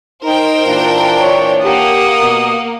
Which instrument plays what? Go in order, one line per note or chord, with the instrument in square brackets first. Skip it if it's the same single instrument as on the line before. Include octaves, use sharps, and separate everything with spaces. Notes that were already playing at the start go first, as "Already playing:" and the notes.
[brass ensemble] D#4 [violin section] A#4 C5 G5
[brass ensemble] A#2 E3 D4 [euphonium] F4
[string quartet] C#5
[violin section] A#3 [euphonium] G4 [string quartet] F#5 D#6
[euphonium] B2